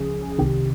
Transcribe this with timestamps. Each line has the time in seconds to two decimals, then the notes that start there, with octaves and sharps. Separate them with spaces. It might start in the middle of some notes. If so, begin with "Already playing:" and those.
Already playing: C#2 C#3 F3 G#4
0.39 C2 C3 D#3 G4